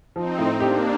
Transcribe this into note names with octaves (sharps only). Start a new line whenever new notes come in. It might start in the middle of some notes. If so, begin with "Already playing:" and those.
F3 C4 D#4
A2
A#3 D4 G4